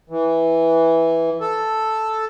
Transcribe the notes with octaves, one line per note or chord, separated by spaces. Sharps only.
E3
A4